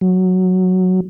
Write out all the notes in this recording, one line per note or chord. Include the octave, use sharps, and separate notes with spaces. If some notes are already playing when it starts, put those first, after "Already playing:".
F#3